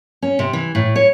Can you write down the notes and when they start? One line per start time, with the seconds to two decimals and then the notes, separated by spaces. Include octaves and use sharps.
0.22 C#4
0.39 C3
0.53 E3
0.75 A2
0.96 C#5